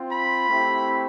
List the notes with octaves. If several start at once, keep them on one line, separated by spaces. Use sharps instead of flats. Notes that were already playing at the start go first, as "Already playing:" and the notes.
Already playing: C4 F4
B5
A3 C4 E4 G4